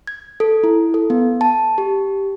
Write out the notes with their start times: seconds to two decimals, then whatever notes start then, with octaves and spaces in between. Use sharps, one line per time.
0.07 G#6
0.40 A4
0.64 E4
0.94 A4
1.10 B3
1.41 A5
1.78 G4